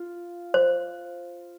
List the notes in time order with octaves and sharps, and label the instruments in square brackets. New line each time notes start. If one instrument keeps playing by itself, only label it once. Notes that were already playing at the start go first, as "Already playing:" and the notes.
Already playing: [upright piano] F4
[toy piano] C5